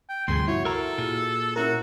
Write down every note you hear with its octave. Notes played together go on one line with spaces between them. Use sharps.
G5
D2 G2 C3 F3 G#4 C6 G#6
E4 F#4 C#5
A4 A#4 A#5
A#2 F4 G#4
C#4 E4 F#4 A#4